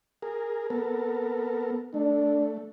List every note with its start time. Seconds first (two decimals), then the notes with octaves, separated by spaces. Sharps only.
0.22 G#4 A#4
0.70 B3 A4 A#4
1.94 A3 D4